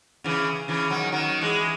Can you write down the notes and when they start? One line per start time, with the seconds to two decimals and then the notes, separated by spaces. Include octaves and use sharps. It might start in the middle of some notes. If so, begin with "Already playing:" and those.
0.24 C#3 E3
0.68 C#3 E3
0.90 D#3 F#3
1.12 D#3 F#3
1.41 E3 G#3